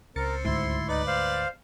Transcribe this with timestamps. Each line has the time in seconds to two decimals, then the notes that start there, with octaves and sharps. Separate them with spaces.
0.16 C#2 C4 A#4 A6 C#7
0.45 D2 G#2 E4 C6
0.88 D#4 B4 D5
1.07 C5 F5